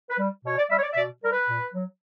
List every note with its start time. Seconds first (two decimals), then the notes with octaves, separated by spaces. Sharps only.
0.09 B4
0.18 G3
0.44 B2 C#5
0.57 D5
0.69 G3 E5
0.78 C#5
0.83 D5
0.93 E5
0.96 B2 D5
1.23 G3 A#4
1.31 B4
1.48 A#2
1.74 F#3